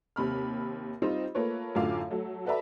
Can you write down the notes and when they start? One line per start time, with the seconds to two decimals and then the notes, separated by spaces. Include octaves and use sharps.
0.16 D#2 C3 B5 F6
1.02 G3 C4 D#4 F4 C5
1.35 A3 A#3 F4 B4 C#5
1.75 F#2 A2 D3 F4 F5 D6
2.10 F#3 A3
2.46 F#4 A4 B4 D5 E5 A#5